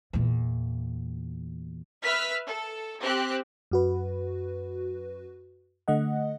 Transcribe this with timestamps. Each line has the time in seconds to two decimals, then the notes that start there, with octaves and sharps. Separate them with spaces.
0.13 E2 A#2
2.03 B4 E5 F6 B6
2.45 A4
3.01 C4 G4 F#6
3.71 F#2 F#4 B4
5.88 D3 A3 D#5 F#5